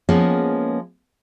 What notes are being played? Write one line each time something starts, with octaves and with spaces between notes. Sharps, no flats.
F3 G#3 A#3 B3 C#4